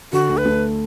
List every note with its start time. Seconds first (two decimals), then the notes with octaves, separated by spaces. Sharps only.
0.13 D3 F#4
0.29 D2
0.37 B4
0.46 A3